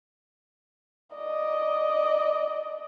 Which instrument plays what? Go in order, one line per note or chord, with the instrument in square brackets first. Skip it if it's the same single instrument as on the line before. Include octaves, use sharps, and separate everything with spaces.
[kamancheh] D5 D#5